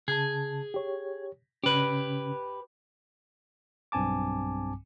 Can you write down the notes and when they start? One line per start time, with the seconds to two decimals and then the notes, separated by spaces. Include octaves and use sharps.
0.08 C#3 G#4 A5
0.74 G4 C#5
1.64 C#3 C#4 G4 B4
3.92 B1 G2 C4 G#5 A5 D6